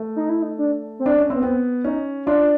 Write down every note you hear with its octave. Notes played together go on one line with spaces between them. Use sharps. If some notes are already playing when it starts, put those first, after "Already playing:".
Already playing: A3
D#4
E4
D#4
D4
C4
D4
C#4
B3 C4
B3 C4
C#4 D#4
D4 F4